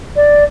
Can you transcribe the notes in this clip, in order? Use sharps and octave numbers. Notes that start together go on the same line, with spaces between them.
D5